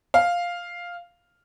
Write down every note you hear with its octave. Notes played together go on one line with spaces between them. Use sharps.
F5